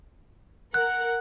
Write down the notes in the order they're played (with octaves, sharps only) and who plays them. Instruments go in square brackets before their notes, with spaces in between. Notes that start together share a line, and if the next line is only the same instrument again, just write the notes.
[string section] A#4 F#5 [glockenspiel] F#6